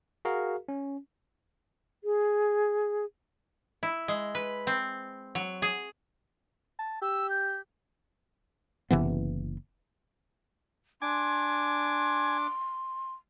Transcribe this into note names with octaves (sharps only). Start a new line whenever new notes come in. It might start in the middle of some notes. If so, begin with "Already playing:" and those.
F#4 G#4 A#4 F5
C#4
G#4
E4
G#3
B4
C4
F#3
G#4
A5
G4 E6
G6
F#1 C3 E3 B3
D4 G#5 C6 D6